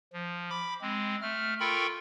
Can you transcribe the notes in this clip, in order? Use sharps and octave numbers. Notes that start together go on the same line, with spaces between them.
F3
B5 D6
G#3 C4
A3 F6
F4 A4 A#4 G5 B5 C#6